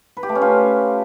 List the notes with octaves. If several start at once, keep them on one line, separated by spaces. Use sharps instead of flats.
B4
G4
A3
C#4
F4